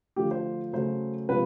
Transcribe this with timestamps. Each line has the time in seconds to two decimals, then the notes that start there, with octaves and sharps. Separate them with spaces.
0.16 D3 F3 A3 G4
0.31 C5
0.73 C#3 F#3 A3 C5
1.29 C3 F3 G#3 B4